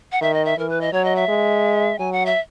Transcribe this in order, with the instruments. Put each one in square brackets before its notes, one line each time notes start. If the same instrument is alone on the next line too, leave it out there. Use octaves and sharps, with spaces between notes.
[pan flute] F#5
[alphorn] D#3 [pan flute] E5
[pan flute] D#5
E5
[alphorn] E3 [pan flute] A#4
[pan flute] B4
D#5
[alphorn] F#3 [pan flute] C#5
[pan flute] D#5
E5
[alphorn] G#3
[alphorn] F#3 [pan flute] G#5
[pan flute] F#5
E5